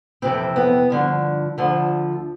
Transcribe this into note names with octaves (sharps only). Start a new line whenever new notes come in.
F2 C3 E3 C4
B3
G2 D3 F3
D2 D3 F3